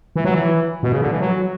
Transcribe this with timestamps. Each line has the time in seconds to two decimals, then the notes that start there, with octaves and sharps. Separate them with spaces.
0.16 E3
0.25 F#3
0.34 E3
0.83 B2
0.92 C#3
1.01 D3
1.11 E3
1.20 F#3